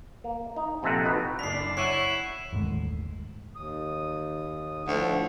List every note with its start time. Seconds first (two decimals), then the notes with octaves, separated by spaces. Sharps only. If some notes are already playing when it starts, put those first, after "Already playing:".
0.24 A#3
0.56 D#4
0.83 A#1 C3 C4 A4 F#5
1.05 D#4 F#4 B4
1.39 F#1 D4 B6 C7 F7
1.77 E4 C#5 F#5 C#6 C7 D#7
2.53 G1 D#2 A2 G#3
3.56 D#2 D#6
4.88 D2 A2 F3 F#5